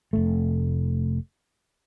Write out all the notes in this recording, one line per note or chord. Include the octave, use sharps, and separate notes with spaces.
F1 C#2 A3